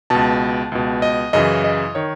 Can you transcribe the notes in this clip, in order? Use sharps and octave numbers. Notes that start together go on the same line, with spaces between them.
C#2 B2 A5
C#2 B2
D#5
F#2 C#3 E3 D#5
D#5
D#3 C#5